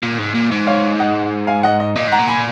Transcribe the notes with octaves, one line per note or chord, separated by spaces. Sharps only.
A#2
G#2
A#2
G#2
C#5 F5
D#5 F#5
F5 G#5
D#5 F#5
D#5
A#2 D#5
G#2 F#5 A#5
A#2
G#5 B5